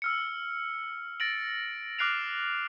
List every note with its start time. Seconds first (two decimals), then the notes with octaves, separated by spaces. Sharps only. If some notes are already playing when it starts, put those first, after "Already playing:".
0.02 E6 F6 C#7
1.20 A6 A#6 D7 F#7
1.99 D6 F6 F#6 C7 D7 F7